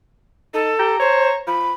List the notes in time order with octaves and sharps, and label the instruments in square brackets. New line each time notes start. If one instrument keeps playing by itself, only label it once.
[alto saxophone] D#4 [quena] A4
[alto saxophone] G4 [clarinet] A#5
[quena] C5 [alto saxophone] C#5
[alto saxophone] F3 [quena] B5